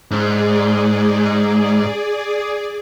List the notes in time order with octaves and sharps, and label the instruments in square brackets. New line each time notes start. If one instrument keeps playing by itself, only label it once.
[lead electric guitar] G#2 [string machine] G#4 D5